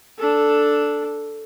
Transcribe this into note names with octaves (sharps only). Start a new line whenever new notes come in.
D4 A4